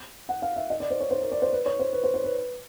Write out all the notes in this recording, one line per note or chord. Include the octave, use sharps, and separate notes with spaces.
F#5
F5
E5
D#5
D5
C5
C#5
C5
A#4
D5
C5
B4
C#5
C5
B4
C5
C5
B4